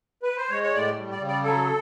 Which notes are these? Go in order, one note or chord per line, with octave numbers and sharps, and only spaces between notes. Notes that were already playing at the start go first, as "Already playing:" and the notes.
B4
C5
G#3 C#5
C#5
A2 D5
G3
D5
C#3
D5
F#3 A4